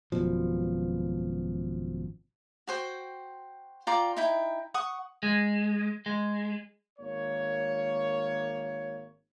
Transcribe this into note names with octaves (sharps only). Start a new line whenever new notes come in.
G#1 F#2 B2 F3
F#4 C5 G5
F4 D5 G5 A#5
D#4 E4 G5
F#5 C#6 D#6
G#3
G#3
G#1 A#3 C#5